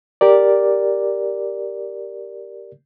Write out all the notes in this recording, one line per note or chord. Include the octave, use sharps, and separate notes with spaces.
G4 A#4 D5